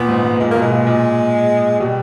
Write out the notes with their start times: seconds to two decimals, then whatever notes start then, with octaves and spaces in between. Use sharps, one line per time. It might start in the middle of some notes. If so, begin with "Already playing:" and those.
Already playing: A#2 B3
0.09 G#2
0.24 G#2
0.40 A#2 G#3
0.51 B2 A#3
0.62 G#3
0.71 A#2
0.87 A#2
1.80 B2 G3